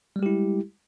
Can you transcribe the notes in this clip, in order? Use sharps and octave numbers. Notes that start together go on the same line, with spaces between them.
G3 G#3 E4 G4